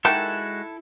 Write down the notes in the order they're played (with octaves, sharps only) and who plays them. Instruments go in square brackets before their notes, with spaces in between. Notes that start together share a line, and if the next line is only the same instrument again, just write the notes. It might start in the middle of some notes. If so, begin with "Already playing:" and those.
[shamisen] D#3 A#3 G4 [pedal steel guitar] G#3 F#4 F#5 [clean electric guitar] E4 A4